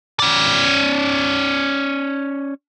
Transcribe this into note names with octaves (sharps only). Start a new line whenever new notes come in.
C#4 D5